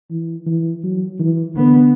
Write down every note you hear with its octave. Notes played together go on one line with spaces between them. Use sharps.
E3
E3
F#3
E3
D3 B3